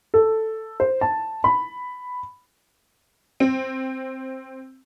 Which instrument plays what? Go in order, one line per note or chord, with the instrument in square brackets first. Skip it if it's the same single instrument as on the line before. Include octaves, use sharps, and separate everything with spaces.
[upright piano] A4
C5
A5
B5
[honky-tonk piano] C4